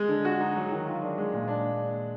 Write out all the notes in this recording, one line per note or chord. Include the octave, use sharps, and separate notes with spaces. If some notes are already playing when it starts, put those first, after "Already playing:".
Already playing: G#3
D3
F#4
D#4
F#3
D#3
F4
D4
G#3
A#2
D4